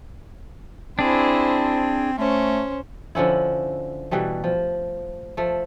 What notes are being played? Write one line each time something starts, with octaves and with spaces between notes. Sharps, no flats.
C4 D4 E4 G#4 C5
A3 C#4 C5
D3 F3 C#4 E4
B2 E3 G3 A3
F3
F3 A3